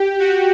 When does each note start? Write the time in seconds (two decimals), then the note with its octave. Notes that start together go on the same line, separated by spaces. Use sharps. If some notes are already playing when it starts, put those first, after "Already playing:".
Already playing: G4
0.19 F#4